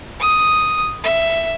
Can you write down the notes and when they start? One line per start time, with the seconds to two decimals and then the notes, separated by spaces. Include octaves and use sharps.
0.20 D#6
1.03 E5